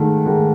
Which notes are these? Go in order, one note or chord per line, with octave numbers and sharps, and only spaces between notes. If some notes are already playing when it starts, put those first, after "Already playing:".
Already playing: G#2 D#3 A3
G#2 D#3 A3